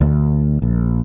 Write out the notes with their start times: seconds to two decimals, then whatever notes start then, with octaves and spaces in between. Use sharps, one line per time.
0.01 D2
0.62 A#1